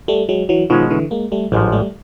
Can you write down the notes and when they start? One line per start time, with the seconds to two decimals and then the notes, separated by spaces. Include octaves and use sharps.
0.08 G3 A3
0.29 F#3 G#3
0.49 E3 F#3
0.70 B2 D#3 F3 G#3 C#4
0.90 D3 E3
1.11 G#3 A#3
1.32 G3 A3
1.52 A1 G#2 F3 F#3 G#3
1.72 G3 A3